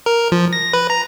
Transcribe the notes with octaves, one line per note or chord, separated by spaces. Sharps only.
A#4
F3
A#6
B4
A#5